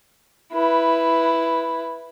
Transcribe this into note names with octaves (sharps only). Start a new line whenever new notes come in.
E4 B4